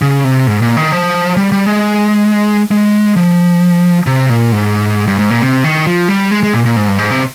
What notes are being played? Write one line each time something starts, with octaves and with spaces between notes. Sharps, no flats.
C#3
C3
G#2
A#2
D#3
F3
G3
G3
G#3
G#3
F3
C3
A#2
G#2
G2
G#2
A#2
C3
D#3
F3
G3
G#3
G#3
A#2
A#2
G#2
G2
G#2
C3